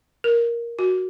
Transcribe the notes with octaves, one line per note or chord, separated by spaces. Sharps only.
A#4
F#4